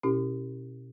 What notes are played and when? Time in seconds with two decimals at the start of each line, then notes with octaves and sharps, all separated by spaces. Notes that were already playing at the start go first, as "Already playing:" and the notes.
0.03 B2 C#4 E4 G4